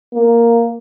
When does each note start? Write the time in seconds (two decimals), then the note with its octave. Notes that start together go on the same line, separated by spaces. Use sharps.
0.14 A#3